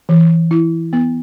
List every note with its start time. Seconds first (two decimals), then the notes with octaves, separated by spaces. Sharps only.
0.09 E3
0.51 E4
0.93 B3